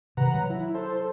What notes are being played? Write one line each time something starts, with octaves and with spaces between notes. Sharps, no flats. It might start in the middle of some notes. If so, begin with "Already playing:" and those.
C3 D#3 B4 F#5 A#5
F#3
E4
A4 C5